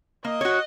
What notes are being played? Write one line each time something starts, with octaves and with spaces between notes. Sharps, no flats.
A#3 D#5
F#4 C#5